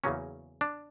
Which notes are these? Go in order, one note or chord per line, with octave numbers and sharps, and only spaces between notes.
E2 C#3 F#3 A#3 C#4
D4